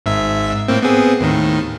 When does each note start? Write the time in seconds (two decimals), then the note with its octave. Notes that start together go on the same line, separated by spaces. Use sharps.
0.06 G#1 G#2 E5
0.68 A2 A#3 C4
0.83 B3 C4 G#4
1.20 D#2 A2 D#3